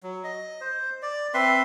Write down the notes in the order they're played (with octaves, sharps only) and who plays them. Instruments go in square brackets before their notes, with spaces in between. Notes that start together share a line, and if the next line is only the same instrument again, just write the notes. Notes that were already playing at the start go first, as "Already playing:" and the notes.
[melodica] F#3
D#5
C5
D5
C4 B4 E5 C6